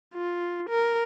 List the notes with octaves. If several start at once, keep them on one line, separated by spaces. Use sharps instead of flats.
F4
A#4